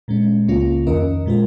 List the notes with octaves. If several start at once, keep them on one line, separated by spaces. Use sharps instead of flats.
A#2 G#3 C#4
C#2 C#3 A#3 C#4 F4
F2 D#3 C#4 A#4 D#5
A#2 G#3 F4 A#4